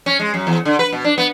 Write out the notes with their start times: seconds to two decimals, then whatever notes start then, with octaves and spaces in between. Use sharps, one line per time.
0.06 C#4
0.19 G#3
0.34 F#2
0.47 E2
0.65 D3
0.79 B4
0.92 B2
1.05 D4
1.18 B3